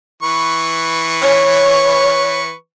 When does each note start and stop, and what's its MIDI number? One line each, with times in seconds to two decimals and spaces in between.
0.23 2.53 52
0.23 2.53 71
0.23 2.53 85
1.22 2.39 73